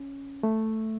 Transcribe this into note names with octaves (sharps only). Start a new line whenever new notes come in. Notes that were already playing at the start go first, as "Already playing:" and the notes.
Already playing: C#4
A3